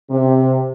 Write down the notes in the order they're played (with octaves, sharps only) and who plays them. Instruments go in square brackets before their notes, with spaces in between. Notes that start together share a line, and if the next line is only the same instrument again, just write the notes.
[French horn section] C3